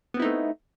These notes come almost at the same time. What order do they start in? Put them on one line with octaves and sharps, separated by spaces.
B3 C4 E4 D#4 A3